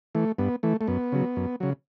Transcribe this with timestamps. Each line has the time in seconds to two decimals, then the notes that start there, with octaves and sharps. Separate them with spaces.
0.15 E3 A3
0.39 G2 B3
0.63 E3 A3
0.81 A3
0.88 F#2 B3
1.12 C#3 F#3
1.36 F#2
1.60 C#3 F#3